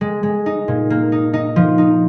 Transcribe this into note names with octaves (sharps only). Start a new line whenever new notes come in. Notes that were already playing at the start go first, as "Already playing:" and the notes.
G#3
G#3
D#4
A#2
A#3
D#4
D#4
F3
D#4